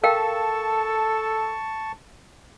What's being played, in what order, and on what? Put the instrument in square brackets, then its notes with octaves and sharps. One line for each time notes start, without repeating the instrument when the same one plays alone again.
[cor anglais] A4 [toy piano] A#4 F5 G5 [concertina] A5 C#6